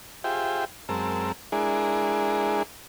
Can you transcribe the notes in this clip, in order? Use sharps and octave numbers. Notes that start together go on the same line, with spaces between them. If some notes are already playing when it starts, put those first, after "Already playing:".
F4 G4 G#4 C5 E5 G5
F#2 G#3 C4 A#4 A5 E6
G#3 D4 E4 G#4 A#4